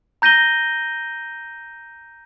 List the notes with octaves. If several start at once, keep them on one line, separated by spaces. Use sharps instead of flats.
A#5 G6 A#6 D#7 G7